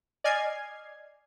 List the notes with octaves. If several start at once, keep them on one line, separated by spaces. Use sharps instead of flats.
D5 D#5 G#5 F6 G#6 C7